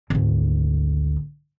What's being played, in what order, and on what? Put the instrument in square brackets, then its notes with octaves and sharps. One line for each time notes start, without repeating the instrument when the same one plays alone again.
[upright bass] G#1 D2